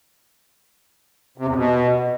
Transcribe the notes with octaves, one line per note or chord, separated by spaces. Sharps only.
C3
E2
B2